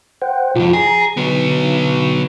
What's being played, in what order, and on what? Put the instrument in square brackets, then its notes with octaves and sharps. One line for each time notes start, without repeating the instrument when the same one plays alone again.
[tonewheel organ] C5 F#5 G5
[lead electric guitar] B1 F2 [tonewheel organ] F4
[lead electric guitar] G#4 [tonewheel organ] A#5
[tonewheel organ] D3 [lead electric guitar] F#3 B3